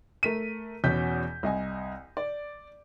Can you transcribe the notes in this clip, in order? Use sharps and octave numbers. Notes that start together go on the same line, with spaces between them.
A3 A#4 B6 D#7
E2 B2 C#4 G6 B6
C2 D#5 G#5
D5